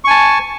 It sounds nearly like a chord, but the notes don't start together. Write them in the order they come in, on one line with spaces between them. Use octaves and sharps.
C#6 G#5 A5